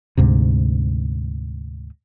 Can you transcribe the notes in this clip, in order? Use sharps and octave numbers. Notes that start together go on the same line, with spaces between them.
D2 G#2 C3